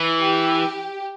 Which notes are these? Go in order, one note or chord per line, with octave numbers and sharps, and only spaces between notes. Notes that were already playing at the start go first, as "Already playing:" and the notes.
Already playing: E3
G4